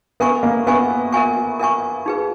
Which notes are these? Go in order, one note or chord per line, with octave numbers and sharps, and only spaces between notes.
B3 A#4 E5 G#5 C#6
A#3
B3 A#4 E5 G#5 C#6
A#4 E5 G#5 C#6
A#4 E5 G#5 C#6
D#4 G#4 B4